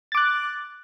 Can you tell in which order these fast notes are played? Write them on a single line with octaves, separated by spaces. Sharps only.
A6 D6 F#6